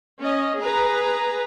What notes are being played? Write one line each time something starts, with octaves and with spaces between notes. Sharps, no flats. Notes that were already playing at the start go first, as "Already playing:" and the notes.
C#4 D#5
G#4 B4 A#5